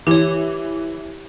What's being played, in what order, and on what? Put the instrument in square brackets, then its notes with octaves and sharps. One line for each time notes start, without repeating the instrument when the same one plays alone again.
[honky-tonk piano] E3 [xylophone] G4 C#5